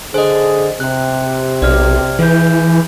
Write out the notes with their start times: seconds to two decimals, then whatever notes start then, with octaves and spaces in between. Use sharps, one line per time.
0.14 D3 G#4 C5 D#5
0.80 C3 F#6
1.62 B1 D5 F6
2.19 E3 G#4 B4 G6